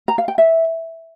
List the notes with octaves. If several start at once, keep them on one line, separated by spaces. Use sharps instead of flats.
A#5
F5
G5
E5